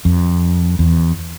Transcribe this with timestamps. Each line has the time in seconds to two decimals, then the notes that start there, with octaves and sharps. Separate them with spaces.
0.05 F2
0.79 E2